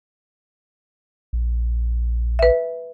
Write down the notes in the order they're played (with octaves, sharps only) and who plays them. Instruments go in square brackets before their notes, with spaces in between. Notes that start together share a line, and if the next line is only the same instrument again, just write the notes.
[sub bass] A#1
[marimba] B4 E5